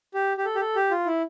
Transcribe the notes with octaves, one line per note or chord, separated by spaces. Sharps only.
G4
G4
A4
G4
A4
G4
F4
E4